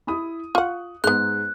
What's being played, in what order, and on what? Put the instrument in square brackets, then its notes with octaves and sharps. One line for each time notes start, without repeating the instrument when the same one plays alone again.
[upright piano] E4 B5 D#6
[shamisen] F4 F#5 [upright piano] C#6 F#6
[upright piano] G#2 G#3 [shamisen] B3 D#4 [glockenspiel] F#6